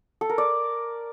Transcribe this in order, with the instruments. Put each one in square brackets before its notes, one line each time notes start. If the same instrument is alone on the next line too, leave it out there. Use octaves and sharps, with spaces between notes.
[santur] A4
A#4
D5